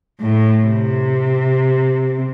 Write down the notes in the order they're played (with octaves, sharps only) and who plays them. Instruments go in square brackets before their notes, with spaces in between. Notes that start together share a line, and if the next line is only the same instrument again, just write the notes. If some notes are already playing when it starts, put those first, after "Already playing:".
[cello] A2
C3